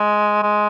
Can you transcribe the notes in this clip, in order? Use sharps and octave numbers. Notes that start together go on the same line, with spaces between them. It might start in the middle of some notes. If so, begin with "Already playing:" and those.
Already playing: G#3
G#3